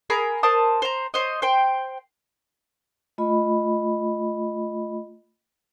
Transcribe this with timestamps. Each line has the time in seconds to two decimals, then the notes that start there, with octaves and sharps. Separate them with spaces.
0.10 G#4 A#4 A#5 B5
0.43 A#4 C5 A5 D#6
0.82 C5 A#5
1.14 C5 C#5 D#5
1.42 C5 G5
3.18 A3 F4 D#5 B5